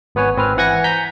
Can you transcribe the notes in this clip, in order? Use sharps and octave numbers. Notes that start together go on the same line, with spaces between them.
G#1 B3 B4 C#5 G#5
G#1 C4 B4 F6
E3 F#5 G#5 G#6 A#6 C#7
A#5 G6 B6